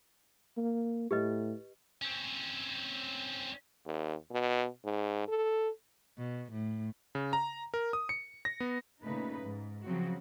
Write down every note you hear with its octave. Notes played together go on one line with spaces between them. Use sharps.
A#3
A2 G4 B4 D#5
C4 C#4
D#2
B2
G#2
A4
B2
A2
C#3
A#5
A#4
D#6
C#7
A#6
B3
A#2 C#3 A3 D#4 B4
G#2
C#3 F3 F#3 C4 F#4